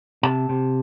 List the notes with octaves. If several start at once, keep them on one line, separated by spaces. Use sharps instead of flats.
C3 A5
C3